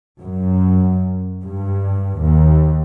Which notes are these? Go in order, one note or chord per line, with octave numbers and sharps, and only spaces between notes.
F#2
G2
D#2